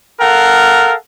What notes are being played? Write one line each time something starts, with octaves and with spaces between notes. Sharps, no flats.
A4 A#4 F5 F#5